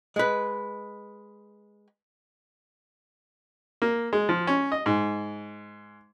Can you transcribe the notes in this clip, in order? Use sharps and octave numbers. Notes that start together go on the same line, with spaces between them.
G#3 B4
A#3
G#3
F3
C#4
D#5
G#2